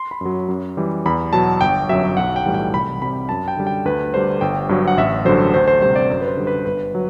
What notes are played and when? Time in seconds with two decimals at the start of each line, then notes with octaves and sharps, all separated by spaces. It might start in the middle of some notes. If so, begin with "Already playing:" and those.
Already playing: C6
0.11 B5
0.21 F#2 F#3
0.49 F#2
0.77 E3 G3
1.06 E2 B5
1.33 B2 F#3 A5
1.61 G1 G5
1.89 F#2 F#3 E5
2.17 B1 F#5
2.36 G5
2.46 A2 E3 G3
2.54 G5
2.73 C2 B5
3.02 C3 G3 B5
3.29 F#2 A5
3.48 G5
3.57 D3 G3
3.67 G5
3.85 D2 B4
4.14 D3 G3 C5
4.41 G1 G5
4.69 G2 F#3
4.88 F#5
4.97 A1 E5
5.25 G2 D3 F#3 C5
5.54 D2 C5
5.68 C5
5.81 C3 G3 C5
5.96 D5
6.09 F#2 C5
6.22 B4
6.28 C5
6.37 D3 G3
6.47 B4
6.66 G1 B4
6.95 F#3